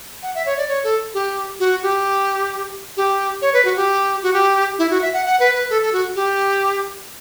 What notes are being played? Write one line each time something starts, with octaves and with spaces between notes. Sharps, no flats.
F#5
E5
C#5
D5
C#5
A4
G4
F#4
G4
G4
C#5
B4
F#4
G4
F#4
G4
E4
F#4
E5
F#5
F#5
B4
B4
A4
A4
F#4
G4